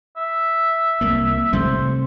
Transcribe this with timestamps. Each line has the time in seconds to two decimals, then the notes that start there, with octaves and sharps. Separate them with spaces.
0.17 E5
1.01 C2 A#3
1.53 C3 G3 A3 C5